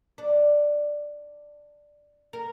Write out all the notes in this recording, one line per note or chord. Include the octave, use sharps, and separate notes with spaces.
D4
A#4